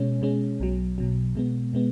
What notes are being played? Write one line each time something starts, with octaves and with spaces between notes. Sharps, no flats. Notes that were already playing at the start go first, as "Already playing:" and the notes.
Already playing: B2 G#3 C#4
B2 G#3 C#4
B1 B2 F#3
B1 B2 F#3
B2 G#3 B3
B2 G#3 B3